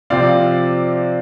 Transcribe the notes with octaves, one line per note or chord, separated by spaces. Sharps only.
C3 F3 C4 D5 F5